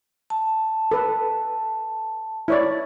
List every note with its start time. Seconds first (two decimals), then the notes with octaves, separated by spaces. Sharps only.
0.30 A5
0.91 A4 B4
2.48 E4 C#5 D5